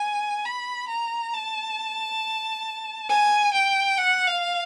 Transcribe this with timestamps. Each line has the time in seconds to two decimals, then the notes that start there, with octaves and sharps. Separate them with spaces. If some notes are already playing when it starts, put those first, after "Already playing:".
Already playing: G#5
0.45 B5
0.88 A#5
1.33 A5
3.10 G#5
3.54 G5
3.98 F#5
4.27 F5